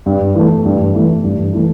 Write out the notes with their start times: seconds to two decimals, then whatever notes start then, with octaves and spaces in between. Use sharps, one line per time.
0.06 G2
0.35 E3 A3
0.65 G2
0.95 E3 A3
1.24 G2
1.53 E3 A3